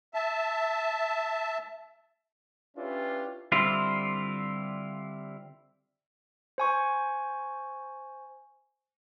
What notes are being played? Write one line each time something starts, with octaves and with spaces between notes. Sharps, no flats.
E5 A5
C#4 D4 E4 F4 G4 B4
D3 G3 C4 E4 F4
C5 G#5 C#6